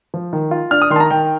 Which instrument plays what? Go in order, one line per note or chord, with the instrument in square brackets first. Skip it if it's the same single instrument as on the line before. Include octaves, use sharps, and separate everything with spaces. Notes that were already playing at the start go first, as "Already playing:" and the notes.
[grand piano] F3
D#3
F4
D4 F6
D#6
D#3 C6
A5
A#5
D#3 G5